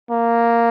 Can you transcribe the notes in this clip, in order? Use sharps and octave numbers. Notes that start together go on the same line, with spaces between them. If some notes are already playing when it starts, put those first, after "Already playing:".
A#3